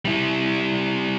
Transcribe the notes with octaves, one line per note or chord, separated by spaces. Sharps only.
G3 E4